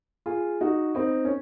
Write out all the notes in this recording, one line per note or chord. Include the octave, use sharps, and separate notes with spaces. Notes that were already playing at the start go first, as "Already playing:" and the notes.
F4 G#4
D#4 F#4
C4 D#4
C#4